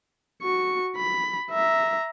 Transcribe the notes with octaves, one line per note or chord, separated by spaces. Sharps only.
F#4 C#6
B5
E5 A#5